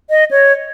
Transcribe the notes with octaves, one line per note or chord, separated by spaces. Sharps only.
D#5
C#5